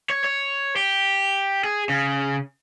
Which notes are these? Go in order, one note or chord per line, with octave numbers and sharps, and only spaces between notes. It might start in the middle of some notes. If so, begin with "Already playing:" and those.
C#5
C#5
G4
G#4
C#3